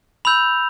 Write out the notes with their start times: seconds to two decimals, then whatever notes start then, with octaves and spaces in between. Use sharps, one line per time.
0.25 B5 E6 G6 F7